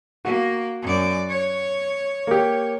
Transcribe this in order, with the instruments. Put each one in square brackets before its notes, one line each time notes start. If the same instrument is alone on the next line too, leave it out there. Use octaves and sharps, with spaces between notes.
[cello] A#3 [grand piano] F#4
[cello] F#2 D5
C#5
[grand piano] A#3 G4